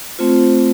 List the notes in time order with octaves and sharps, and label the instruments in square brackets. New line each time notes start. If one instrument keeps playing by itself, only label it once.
[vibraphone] A3 C4 F4 C5